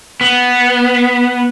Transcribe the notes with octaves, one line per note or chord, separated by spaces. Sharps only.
B3